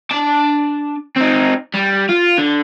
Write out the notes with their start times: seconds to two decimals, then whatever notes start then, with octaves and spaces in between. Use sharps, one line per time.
0.11 D4 A5
1.17 C4 D#4
1.74 G3
2.09 F4
2.38 D3